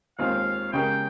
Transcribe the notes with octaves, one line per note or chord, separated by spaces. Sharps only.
D#2 D#3 G#3 C4 F4 F5
C#3 G#3 C#4 G4 A#4 G5